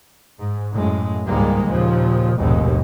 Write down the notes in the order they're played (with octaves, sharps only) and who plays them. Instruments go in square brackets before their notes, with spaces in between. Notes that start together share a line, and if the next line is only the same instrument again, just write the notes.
[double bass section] G#2
F#2 A2 G#3
C#2 G#2 D#3 G3 G#3 A#3
D#2 A#2 C#3 F3
F1 A#1 D#2 G#2 B2 G#3